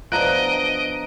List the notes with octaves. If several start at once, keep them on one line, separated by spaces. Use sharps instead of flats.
F3 B3 D4 D#5 A#5 F#6 D7